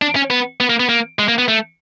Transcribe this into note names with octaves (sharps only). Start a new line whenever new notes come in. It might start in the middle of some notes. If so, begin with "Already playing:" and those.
D4
C#4
B3
B3
A#3
B3
A#3
G#3
A#3
B3
A3